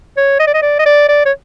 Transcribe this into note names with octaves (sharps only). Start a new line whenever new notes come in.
C#5
D#5
D5
D#5
D5
D#5
D5
D5
C#5